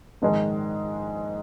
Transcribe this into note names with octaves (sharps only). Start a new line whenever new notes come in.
A#1 G#2 D#3 G#3